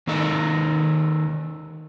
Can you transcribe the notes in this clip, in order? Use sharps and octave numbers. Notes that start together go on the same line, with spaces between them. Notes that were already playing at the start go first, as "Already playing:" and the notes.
D#3 A#3 D#4 A4 D#5